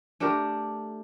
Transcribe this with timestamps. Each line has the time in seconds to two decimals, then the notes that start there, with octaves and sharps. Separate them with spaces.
0.20 A3 D4 G4 A#4